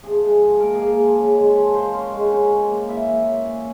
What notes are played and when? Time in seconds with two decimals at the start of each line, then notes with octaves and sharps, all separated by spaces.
0.03 F3 G#4
0.22 G#2
0.41 F3
0.60 A#3 A#4
0.75 G#4
0.80 A#3
0.98 F3
1.18 C#3
1.36 G#3
1.55 F3
1.74 F3 C5
1.93 C#4
2.12 G#3
2.31 C#4
2.50 C#4
2.70 A#3
2.88 E3 E5
3.07 A#3
3.26 C#4
3.46 A#2